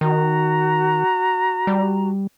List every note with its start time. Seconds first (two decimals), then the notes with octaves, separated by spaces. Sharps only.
0.01 D#3 F#4 A#5
1.67 G3